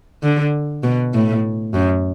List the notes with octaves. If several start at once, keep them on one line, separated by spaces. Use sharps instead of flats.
D3
B2
A2
F#2